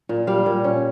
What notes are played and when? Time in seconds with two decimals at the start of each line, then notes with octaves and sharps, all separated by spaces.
0.09 A#2
0.27 G3 F5
0.46 A#2
0.64 C#4